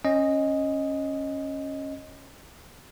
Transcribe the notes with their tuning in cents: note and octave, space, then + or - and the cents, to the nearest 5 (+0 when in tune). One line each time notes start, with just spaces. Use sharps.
C#4 -15 D#5 +0